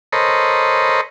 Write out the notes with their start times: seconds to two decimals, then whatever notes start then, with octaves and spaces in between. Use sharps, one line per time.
0.13 A4 A#4 C5 C#5 D#5 B5